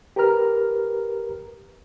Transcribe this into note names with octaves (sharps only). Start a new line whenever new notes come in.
G4 A#4 B4 A#5 F6